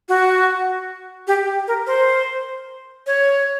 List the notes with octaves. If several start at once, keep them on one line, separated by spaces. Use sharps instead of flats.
F#4
G4
A#4
C5
C#5